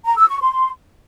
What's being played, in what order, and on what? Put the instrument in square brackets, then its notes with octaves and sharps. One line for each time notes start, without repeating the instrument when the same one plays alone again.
[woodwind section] A#5
E6
C#6
C6